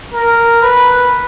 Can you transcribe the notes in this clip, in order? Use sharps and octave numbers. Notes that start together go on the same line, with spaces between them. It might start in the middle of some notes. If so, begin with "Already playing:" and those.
A#4
B4